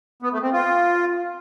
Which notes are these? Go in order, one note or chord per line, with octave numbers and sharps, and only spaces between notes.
B3
A3
C4
F4